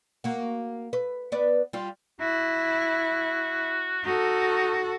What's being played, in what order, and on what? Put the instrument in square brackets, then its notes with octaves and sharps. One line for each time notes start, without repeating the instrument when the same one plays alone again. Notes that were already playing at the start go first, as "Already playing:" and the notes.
[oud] A#3 F#4
B4
B3 B4 D5
G3 F4
[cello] E4 [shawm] F#4
[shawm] D#4 [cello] F#4 A4